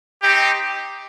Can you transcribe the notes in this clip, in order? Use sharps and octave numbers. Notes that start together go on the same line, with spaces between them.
C4 D#4 G4